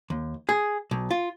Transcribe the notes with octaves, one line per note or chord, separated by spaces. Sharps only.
D#2
G#4
B1
F4